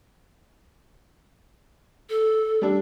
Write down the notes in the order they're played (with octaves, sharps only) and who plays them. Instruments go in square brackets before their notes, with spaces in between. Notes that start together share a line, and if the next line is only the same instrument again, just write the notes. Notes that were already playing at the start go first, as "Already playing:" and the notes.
[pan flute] A4
[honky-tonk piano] G3 D4